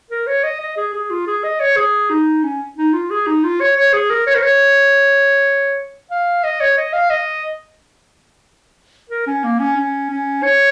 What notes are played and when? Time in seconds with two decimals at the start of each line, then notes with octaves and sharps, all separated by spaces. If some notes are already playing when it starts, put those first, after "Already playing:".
0.10 A#4
0.27 C#5
0.44 D#5
0.61 D#5
0.77 G#4
0.94 G#4
1.10 F4
1.27 G#4
1.44 D#5
1.60 C#5
1.77 G#4
2.10 D#4
2.43 C#4
2.77 D#4
2.93 F4
3.10 G#4
3.27 D#4
3.44 F4
3.60 C#5
3.77 C#5
3.93 G#4
4.10 A#4
4.27 C#5
4.35 A#4
4.42 C#5
6.11 F5
6.44 D#5
6.61 C#5
6.77 D#5
6.93 F5
7.10 D#5
9.10 A#4
9.27 C#4
9.44 A#3
9.60 C#4
9.77 C#4
10.10 C#4
10.43 C#5